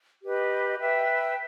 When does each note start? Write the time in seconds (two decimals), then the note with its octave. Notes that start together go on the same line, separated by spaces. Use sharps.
0.22 G4 B4 D#5
0.80 B4 E5 G5